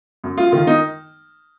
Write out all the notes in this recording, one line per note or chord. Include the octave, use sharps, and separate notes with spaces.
F#2
F4
D#3 F4
D#4